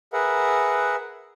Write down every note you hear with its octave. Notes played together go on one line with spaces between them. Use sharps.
G#4 A#4 B4 E5 F#5